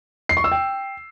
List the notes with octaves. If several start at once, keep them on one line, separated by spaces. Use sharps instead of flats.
C7
C#6
E6
G5